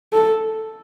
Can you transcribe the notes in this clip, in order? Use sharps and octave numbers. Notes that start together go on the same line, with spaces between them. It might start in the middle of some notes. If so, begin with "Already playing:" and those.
A4